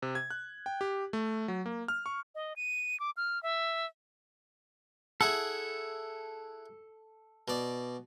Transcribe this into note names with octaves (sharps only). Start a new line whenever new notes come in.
C3
G#6
F#6
G5
G4
A3
F#3
A#3
F6
C#6
D#5
D#7
D6
F6
E5
E4 G#4 A4 F#5
B2 D5